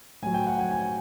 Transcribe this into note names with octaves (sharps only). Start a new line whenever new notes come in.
A2 F#3 G#5
G5
F#5
G#5
G#5